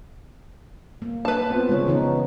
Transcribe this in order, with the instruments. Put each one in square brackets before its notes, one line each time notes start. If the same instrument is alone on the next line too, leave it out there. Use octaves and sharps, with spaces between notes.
[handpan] A#3
[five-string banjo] B4 A5
[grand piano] B3 C4 F4
[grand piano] C#3 F3 [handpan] G#3 C#5
[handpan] E3 B3 D#4